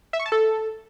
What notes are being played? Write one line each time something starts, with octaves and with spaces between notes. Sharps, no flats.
E5
C#6
A5
A4